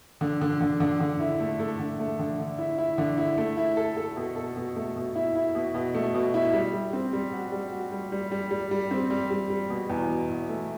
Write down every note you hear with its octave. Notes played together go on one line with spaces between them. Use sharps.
D3
D3
D3
D3
D3
E4
A3
A3
D3
A3
D3
D3
E4
E4
D3
E4
A3
E4
A4
A4
B2
A4
B2
A3
B2
E4
E4
B2
B2
A3
B2
E4
G3
G3
C4
G3
F#4
G3
F#4
G3
G3
G3
G3
G3
C4
G3
G3
G3
B2
E2
B2
E2
A3